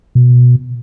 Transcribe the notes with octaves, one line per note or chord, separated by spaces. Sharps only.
B2